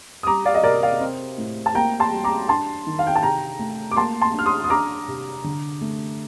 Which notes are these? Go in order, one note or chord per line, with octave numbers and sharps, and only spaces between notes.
D#6
G3 A#5 D6
D5 F5
D#5
C3 A#4 D5
D5 F5
C4
A2
A5
A#3 G5 A#5
A5 C6
G3
A#5 D6
D4 A5 C6
D#3
F5
G5
A5
C3 G5 A#5
A3
D6
A#3 A5 C6
A5 C6
D4 F6
C6 D#6
D#6
D4 A#5 D6
C3
D3
A3